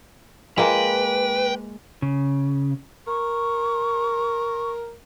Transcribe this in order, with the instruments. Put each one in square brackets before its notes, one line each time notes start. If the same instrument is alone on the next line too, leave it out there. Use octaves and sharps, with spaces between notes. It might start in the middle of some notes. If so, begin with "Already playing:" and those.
[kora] G#3 A#3 [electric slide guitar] B4 [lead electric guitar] G5
[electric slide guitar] C#3
[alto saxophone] A#4 [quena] C#6